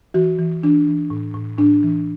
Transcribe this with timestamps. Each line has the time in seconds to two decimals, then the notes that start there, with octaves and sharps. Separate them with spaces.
0.14 E3 F#4
0.39 E3
0.63 E3 D4
0.87 E3
1.10 A2
1.34 A2
1.58 A2 D4
1.83 E3